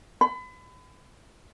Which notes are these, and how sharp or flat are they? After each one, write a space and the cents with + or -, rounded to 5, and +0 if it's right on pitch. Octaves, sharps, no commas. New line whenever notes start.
B5 +35